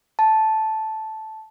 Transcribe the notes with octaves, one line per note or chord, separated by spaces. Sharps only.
A5